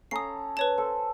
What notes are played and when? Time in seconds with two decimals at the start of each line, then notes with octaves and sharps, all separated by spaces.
0.11 C#4 A4 A#5 D#6 C7
0.57 B4 C#5 A5
0.78 A4 C5